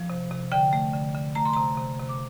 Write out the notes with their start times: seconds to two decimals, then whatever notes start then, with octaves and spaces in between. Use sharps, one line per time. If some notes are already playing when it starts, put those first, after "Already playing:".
Already playing: F3
0.10 C3
0.31 C3
0.52 D3 G5
0.73 A3
0.93 D3
1.15 D3
1.35 A3 A#5
1.45 C6
1.53 C3 A#5
1.78 C3
1.99 C3
2.09 D6